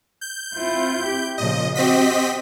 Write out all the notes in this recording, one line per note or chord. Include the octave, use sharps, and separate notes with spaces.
G6
C4 E4 F4
G4
A#2 C#3 F3 D#5
C4 F#4 G4 D#5 B6